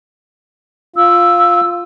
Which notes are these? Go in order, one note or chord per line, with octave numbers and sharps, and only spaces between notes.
F4 E6